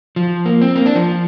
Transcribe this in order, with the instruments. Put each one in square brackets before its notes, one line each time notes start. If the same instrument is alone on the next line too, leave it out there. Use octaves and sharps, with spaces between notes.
[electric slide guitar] F3
A#3
C4
A#3
D4
F3